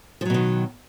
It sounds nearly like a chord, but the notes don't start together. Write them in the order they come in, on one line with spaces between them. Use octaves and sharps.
F3 F#3 B2 D#3